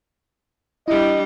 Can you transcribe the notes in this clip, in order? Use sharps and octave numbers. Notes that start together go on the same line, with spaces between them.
G3 D4 E4 D#5